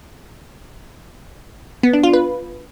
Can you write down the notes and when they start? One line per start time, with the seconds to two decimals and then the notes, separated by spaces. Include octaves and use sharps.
1.83 B3
1.93 D4
2.03 F4
2.13 B4